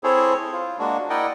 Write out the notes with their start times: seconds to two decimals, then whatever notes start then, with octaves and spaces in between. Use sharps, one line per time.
0.04 C4 E4 G#4 A4 C5 C#5
0.52 F4
0.79 G#3 A#3 D4 F#4
1.10 E4 A#4 D5 D#5 F#5 G5